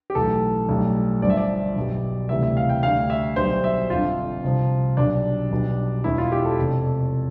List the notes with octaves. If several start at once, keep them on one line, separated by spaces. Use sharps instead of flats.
G4
B1 A2 E3 A4
B1 A2 G3
G1 G2 F3 D5
E5
D5
B1 B2 G3
D2 C3 E3 G3 E5
E5
F5
G5
D2 D3 G3 F5
E5
B1 B2 G3 C5
E5
G1 F2 D3 F4
C2 C3 F3
B1 B2 G3 D4
B1 B2 G3
E1 E2 B2 E4
F4
G4
A4
F1 F2 C3